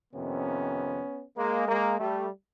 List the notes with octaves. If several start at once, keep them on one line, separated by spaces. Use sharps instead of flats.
F2 C3 D#3 B3 C#4
G#3 A#3
G#3 A#3
G3 A3